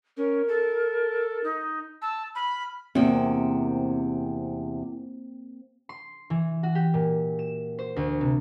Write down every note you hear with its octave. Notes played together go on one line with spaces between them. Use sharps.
C#4 A#4
A4
D#4
A5 E6
B5 F6
E2 C3 A#3 C4
C6
E3
F#4
G4
A#2
E7
C5
D2
C3